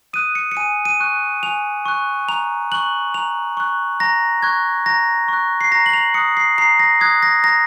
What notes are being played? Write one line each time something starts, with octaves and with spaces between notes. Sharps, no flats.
D#6 F#6 D#7
C#7
C#7
G#5 D#7
D#7
C#6 F#6
G#5 F7
C#6 F#6
A#5 F7
C#6 F#6 F#7
A#5 F7
C#6 F#6
A#5 A#6
C#6 F#6 G#6
A#5 A#6
C#6 F#6
C7
A#5 A#6
F#7
F7
D#6 F#6 C#7
C7
A#5 C7
A#6
D#6 F#6 G#6
A#6
A#5 A#6